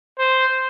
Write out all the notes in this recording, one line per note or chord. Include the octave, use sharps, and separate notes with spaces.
C5